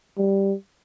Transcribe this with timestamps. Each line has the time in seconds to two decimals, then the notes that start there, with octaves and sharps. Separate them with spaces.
0.18 G3